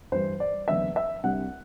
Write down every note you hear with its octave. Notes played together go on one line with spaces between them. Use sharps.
G2 E3 G3 C5
D5
F#1 E2 D3 E5
E5
C2 C3 G3 D4 F#5